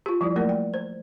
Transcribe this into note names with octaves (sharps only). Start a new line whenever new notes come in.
F4 G4
F3 G3 E4
F#3 A3 A#3 G4 A#4 D5
G5
C5